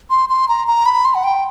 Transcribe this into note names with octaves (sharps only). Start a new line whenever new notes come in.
C6
C6
A#5
A#5
B5
C6
F#5
G5